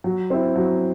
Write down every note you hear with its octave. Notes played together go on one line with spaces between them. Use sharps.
F#3
C4 E4
F#3